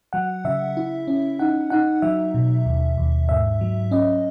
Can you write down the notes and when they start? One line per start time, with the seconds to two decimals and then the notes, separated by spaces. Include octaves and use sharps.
0.13 F#3 F#5
0.45 C#3 E5
0.77 E4
1.07 C#4
1.39 D#4 F#5
1.70 D#4 F#5
2.02 F#3 E5
2.34 B2
2.66 D#2
2.97 D#2
3.29 G#2 E5
3.61 F#3
3.91 C#4 D#5